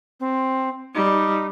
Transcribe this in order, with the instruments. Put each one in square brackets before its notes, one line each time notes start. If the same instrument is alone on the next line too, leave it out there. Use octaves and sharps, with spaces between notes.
[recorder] C4
[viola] G3 [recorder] D#4